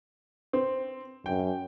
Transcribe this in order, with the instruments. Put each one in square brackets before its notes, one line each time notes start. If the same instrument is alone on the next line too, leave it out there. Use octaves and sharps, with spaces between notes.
[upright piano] C4
[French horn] F#2 [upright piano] G5